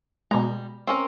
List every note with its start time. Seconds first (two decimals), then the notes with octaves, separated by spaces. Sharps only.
0.31 B2 G3 G#3 A#5
0.87 C4 C#4 A#4